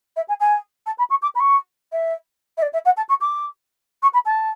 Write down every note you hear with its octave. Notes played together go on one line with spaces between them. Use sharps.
E5
G#5
G#5
A5
B5
C#6
D6
B5
C#6
E5
E5
D5
E5
F#5
A5
C#6
D6
C#6
B5
A5